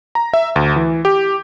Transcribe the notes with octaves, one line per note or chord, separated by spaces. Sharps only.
A#5
E5
D2
E3
G4